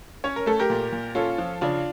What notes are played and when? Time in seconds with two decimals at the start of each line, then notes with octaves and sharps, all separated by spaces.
0.24 C#4 C#5
0.36 A#4
0.46 A3 A4
0.59 G4 A#4
0.70 A#2
0.92 A#2
1.15 C#4 F4 A4
1.38 F3
1.61 C#3 D4 F4